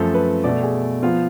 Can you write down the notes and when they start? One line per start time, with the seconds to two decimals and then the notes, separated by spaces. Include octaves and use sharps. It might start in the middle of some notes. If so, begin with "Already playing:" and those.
Already playing: F#2 F3 A3 A4
0.14 B4
0.44 B2 A3 D5
0.63 G#4
1.02 F3 B3 F4